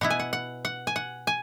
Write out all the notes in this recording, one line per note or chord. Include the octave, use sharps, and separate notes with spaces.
B2 B3 E4 F#5
G#5
F#5
F#5
F#5
G#5
F#5
G#5